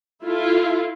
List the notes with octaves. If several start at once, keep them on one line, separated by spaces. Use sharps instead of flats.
E4 F4 A4